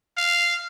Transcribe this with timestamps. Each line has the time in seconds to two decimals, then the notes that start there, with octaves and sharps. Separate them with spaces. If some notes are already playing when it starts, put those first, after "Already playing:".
0.17 F5